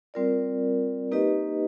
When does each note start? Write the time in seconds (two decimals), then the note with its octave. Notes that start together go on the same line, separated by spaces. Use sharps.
0.14 G3 C4 F4 A#4 D5
1.12 A#3 D#4 G4 B4 D#5